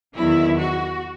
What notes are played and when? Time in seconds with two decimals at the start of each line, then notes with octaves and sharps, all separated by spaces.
0.15 E2 D#3 F#3 E4
0.59 F#4